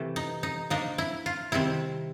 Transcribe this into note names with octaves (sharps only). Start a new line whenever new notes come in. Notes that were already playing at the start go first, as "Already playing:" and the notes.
Already playing: C3 E3 A3
D#4
D#4
F3 A#3 D4 D#4
E4
F4
C3 D#3 G3 C4 E4